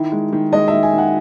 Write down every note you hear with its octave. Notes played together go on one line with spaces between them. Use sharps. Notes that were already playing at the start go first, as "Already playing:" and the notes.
Already playing: D#3 E4
G#3
D#3
G#3 D#5
E5
D#3
G#5
D#3
F#5